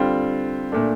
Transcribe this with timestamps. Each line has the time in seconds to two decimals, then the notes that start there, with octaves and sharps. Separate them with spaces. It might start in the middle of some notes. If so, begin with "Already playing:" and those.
Already playing: D3 G3 C4 F4
0.72 A#2 A3 D4